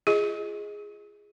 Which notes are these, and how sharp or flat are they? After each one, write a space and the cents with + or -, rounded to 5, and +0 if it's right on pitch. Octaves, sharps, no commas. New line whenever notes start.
F4 -20 G#4 +0 D#5 +0